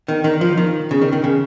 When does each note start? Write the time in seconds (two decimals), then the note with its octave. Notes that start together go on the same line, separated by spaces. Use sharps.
0.08 D#3
0.24 D#3
0.41 F3
0.57 D#3
0.91 C#3
1.02 D#3
1.12 D#3
1.24 C#3